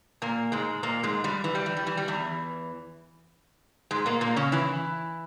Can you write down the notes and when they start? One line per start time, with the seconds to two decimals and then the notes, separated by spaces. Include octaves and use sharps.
0.22 A#2 A#3
0.52 G#2 G#3
0.83 A#2 A#3
1.03 G#2 G#3
1.24 G2 G3
1.44 E3
1.55 G3
1.66 E3
1.77 G3
1.86 E3
1.97 G3
2.08 E2 E3
3.91 G#2 G#3
4.06 A#2 A#3
4.21 A#2 A#3
4.36 C#3 C#4
4.52 E3 E4